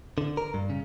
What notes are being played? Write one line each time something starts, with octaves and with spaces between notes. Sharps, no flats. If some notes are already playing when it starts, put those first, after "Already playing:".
D3
A#4
G2
C#3